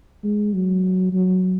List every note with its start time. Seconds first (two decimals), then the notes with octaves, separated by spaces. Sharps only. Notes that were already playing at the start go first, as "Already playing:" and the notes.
0.24 G#3
0.54 F#3
1.13 F#3